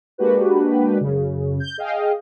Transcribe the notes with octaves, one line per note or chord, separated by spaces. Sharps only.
G#3 A#3 D4 F#4 G4 B4
F#2 C#3
G6
G#4 D#5 F5 G5